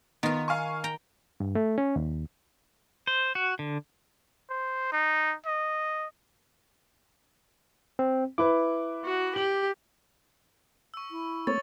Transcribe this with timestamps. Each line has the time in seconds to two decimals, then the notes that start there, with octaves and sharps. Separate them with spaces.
0.23 D#3 B3 F4
0.48 F5 G#5 C#6
0.84 G5 A#5
1.40 G2
1.55 A3
1.78 C#4
1.96 D#2
3.07 C5
3.35 F#4
3.59 D3
4.50 C5
4.92 D#4
5.46 D#5
7.99 C4
8.38 E4 B4 D6
9.05 F#4
9.36 G4 F#7
10.94 C#6 E6
11.11 E4
11.47 A3 A#3 C4 C#5 A6